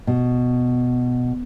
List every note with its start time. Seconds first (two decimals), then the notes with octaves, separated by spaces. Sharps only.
0.07 B2